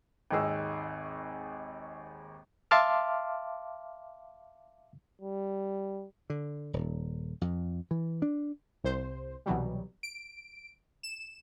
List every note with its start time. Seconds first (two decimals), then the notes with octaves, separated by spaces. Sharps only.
0.31 G#1 D#2 D#4 G#4 E6
2.71 E5 F5 A5 C6 D6 F6
5.21 G3
6.30 D3
6.73 D#1
7.41 F2
7.91 E3
8.22 D4
8.84 C2 C5
9.46 C2 B2 E3 F#3 G3
10.03 D7
11.03 E7